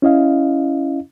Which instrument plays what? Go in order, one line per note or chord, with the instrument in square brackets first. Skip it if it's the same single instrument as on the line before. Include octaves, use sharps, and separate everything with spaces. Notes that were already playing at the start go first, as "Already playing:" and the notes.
[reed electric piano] C#4 E4 D#5 F5